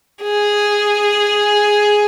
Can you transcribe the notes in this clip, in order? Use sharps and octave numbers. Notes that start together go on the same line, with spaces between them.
G#4